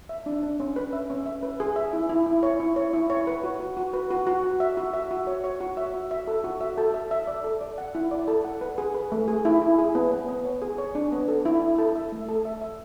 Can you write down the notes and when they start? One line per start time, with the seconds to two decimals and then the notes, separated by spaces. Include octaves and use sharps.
0.09 E5
0.26 D4
0.43 D4
0.60 C#4
0.76 B4
0.93 E5
1.10 C#4
1.26 E5
1.43 B4
1.60 G#4
1.76 E5
1.93 E4
2.09 E4
2.26 E4
2.43 C#5
2.60 E4
2.76 C#5
2.93 E4
3.10 C#5
3.27 B4
3.43 F#4
3.60 F#4
3.77 F#4
3.93 B4
4.10 F#4
4.27 F#4
4.43 F#4
4.60 E5
4.77 F#4
4.93 E5
5.11 F#4
5.27 C#5
5.44 C#5
5.60 F#4
5.77 E5
5.94 F#4
6.11 E5
6.27 A4
6.44 F#4
6.61 E5
6.78 A4
6.94 E5
7.11 E5
7.27 D5
7.44 A4
7.61 D5
7.78 F#5
7.95 E4
8.11 D5
8.28 A4
8.45 F#5
8.61 B4
8.78 G#4
8.94 B4
9.12 A3
9.28 G#4
9.45 E4
9.62 E4
9.78 G#4
9.95 B3
10.12 B3
10.28 B3
10.45 C#5
10.62 G#4
10.78 C#5
10.95 D4
11.12 B3
11.28 A4
11.45 E4
11.62 E4
11.78 A4
11.95 E5
12.12 A3
12.29 A4
12.45 E5
12.62 E5